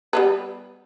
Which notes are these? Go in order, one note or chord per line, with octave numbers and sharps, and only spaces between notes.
G3 B3 B4